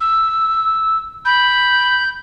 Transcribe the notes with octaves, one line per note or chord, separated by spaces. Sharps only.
E6
B5 G6